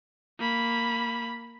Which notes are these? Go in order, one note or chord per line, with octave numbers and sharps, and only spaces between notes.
A#3 B5